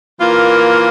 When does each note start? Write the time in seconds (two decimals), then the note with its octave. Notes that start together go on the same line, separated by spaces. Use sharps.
0.20 E3 A#3 F4 A#4